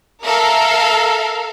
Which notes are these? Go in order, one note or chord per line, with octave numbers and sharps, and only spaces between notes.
A4 A#4 E5 F5